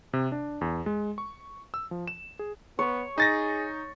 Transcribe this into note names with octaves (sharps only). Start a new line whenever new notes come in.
C3
D4
E2
G#3
C#6
E6
F3
E7
G#4
B3 C#5
D#4 G#4 A6 A#6